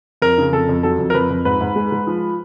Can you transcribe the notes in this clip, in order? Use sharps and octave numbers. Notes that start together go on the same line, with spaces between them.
F2 A#4
C#3
F2 A4
F2
F#3 A4
F2
A#4
F2 B4
F2
G#2 B4
G#2
G#3
G#3
F3